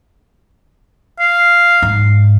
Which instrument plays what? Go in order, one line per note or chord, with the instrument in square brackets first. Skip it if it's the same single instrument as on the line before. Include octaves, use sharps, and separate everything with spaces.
[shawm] F5
[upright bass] G#2